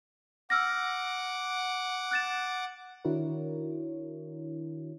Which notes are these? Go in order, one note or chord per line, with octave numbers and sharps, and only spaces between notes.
F#5 D6 E6 F6 A#6
F#6 A6 E7
D#3 D4 E4 F#4 A#4 C#5